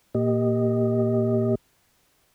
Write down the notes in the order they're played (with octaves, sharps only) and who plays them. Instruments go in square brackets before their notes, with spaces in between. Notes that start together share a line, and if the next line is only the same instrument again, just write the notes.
[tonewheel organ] A#2 A#3 G4 D#5